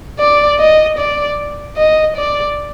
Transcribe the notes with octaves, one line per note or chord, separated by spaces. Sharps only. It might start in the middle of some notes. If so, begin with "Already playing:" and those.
D5
D#5
D5
D#5
D5